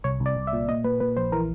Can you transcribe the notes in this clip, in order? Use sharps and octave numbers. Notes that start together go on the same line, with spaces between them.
C2 C#5
C2
D5
C2
E5
A#2
A#2 D#5
A#2 B4
A#2 B4
A#1 C5
E3 A#4